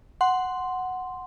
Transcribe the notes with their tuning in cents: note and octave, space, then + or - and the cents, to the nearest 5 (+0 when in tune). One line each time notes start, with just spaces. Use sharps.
F#5 +0 C6 -5